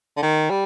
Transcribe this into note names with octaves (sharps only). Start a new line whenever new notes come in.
D3
D#3
G3